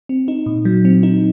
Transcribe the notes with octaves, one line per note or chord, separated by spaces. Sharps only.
C4
D#4
A#2
F#3
C4
D#4